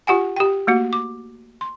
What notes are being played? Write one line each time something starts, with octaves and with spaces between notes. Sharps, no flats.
F4 G4 F#5 G#5
G4 G5
A3 A#3 F#4
D6
C6